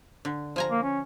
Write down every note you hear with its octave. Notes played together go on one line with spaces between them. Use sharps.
D3
F3 G#5 A#5
A#3
C#4